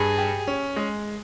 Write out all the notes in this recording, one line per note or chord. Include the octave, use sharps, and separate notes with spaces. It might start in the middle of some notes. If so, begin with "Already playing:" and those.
Already playing: G2 G#4
G4
C#4
G#3